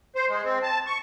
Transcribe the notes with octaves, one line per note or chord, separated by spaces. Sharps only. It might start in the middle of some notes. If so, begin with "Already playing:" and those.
C5
G#3
C4
A5
C#6